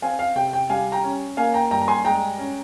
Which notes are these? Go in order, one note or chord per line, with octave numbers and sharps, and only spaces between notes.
C4 F5 G#5
F5
C3 G5
G5
G3 F5 G#5
G5 A#5
C#4
A#3 F5 G#5
G5 A#5
G2 G5 A#5
A#5
G#5 C6
G#3 G5 A#5
C#4